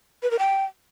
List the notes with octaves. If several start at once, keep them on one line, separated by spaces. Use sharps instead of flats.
B4
A#4
G5